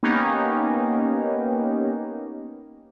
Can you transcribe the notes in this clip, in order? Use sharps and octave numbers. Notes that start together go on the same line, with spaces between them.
A#3 B3 C#4 D#4 G4